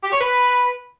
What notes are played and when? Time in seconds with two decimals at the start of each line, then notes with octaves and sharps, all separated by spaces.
0.02 G4
0.11 C#5
0.19 B4